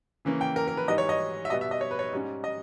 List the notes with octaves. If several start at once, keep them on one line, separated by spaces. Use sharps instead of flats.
C#3 E3 A#3 C#4
G5
A#4
A#4
B4
G#2 E3 G3 D#5
C#5
D#5
E5
B2 G3 B3 D#5
E5
D#5
C#5
B4
C#5
G#2 G3 C#4
D#5